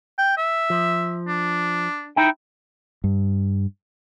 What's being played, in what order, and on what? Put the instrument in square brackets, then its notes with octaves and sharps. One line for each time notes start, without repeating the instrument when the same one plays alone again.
[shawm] G5
E5
[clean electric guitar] F3
[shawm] D4
[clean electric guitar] D#4 E4 G5
[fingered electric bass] G2